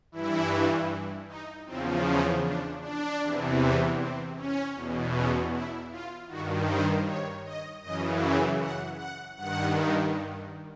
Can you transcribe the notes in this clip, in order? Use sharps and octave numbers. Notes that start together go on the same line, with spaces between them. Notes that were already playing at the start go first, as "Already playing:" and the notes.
G2 E3 E4
D#4
E2 C#3 F3 C4
C#4
D4
D4
E2 C3 E3
C4
C#4
E2 B2
C#4
E4
F4
G2 D#3 F#4
C5
C#5
D#5
F#2 C#3 E3 D#5
E5
F#5
F#5
G2 D#3 F#5